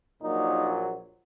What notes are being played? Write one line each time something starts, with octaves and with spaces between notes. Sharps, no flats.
A#1 A#2 F#3 D#4